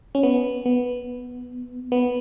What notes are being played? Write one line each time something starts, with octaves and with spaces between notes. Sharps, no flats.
C#4
B3
B3
B3